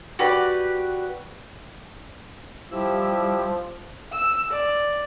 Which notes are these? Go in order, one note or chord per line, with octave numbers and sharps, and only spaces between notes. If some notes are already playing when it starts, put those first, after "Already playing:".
F#4 G4 B4 D5
F3 G3 E4 G4 E6
E6
D5